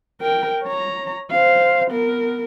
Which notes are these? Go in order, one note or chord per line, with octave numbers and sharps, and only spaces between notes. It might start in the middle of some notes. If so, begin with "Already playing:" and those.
A#4 G5
C#5 A#5
C5 F5
B3 A#4